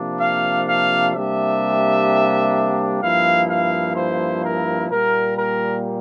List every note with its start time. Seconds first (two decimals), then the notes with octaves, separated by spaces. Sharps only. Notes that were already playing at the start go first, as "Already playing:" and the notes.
Already playing: C3 F3 A#3 D4
0.20 F5
0.67 F5
1.14 C3 G3 A#3 D4 E5
3.02 G2 F3 A#3 E4 F5
3.50 F5
3.97 C5
4.44 A#4
4.91 A#2 G3 A#3 A#4
5.38 A#4